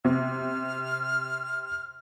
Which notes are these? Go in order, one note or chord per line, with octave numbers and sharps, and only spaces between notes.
C3 F6